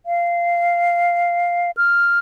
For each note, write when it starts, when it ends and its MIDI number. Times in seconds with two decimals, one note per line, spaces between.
0.06 1.71 77
1.77 2.19 89